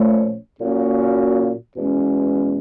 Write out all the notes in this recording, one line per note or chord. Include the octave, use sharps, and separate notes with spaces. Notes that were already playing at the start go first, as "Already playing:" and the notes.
Already playing: A#2 F3 A3 C#4
A#2 F#3 A#3 C#4 F#4
E2 B2 G#3 C#4